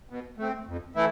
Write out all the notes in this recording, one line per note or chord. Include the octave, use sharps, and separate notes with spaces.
B2
A3 C4
F2
E3 A3 E4